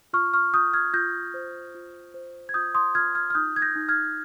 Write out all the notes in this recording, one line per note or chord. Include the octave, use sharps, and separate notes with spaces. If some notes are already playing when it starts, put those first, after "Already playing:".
F4 C#6 F6
C#6 F6
F4 D#6 G6
F6 G#6
F4 G6 A#6
C5
F4
C5
G#6
F4 D#6 G6
C6 D#6
F4 F6 G#6
F6 G#6
F6
D#4 D#6 G6
G#6
G6 A#6
D#4
F6 G#6